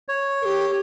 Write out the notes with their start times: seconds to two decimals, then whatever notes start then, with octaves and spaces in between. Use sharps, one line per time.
0.08 C#5
0.42 A#4
0.45 G4